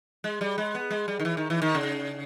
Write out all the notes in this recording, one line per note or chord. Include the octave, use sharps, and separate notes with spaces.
G#3
G3
G#3
B3
G#3
G3
D#3
E3
D#3
E3
D#3
C#3